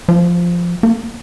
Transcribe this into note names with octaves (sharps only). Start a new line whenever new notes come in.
F3
A#3